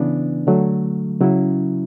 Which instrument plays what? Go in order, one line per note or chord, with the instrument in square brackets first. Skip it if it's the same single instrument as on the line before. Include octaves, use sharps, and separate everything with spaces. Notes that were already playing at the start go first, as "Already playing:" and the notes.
Already playing: [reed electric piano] C#3 E3 B3 D4
D3 F#3 A3
C#3 F#3 C#4 E4